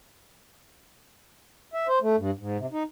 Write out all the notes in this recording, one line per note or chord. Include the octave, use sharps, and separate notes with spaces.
E5
C5
A3
G2
G#2
C3
D#4